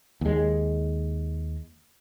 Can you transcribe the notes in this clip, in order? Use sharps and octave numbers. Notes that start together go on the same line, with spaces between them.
D#2 G#3